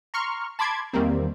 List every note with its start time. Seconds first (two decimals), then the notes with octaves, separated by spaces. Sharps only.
0.14 A#5 C6 C#6 F6
0.59 A5 B5 C6 D6 G#6
0.93 E2 D#3 G3 A#3 C4